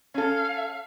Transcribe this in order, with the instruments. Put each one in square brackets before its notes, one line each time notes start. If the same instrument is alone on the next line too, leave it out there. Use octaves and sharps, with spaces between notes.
[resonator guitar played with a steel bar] C#4 A4 [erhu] F5